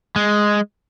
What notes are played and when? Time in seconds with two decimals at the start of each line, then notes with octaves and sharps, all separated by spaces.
0.16 G#3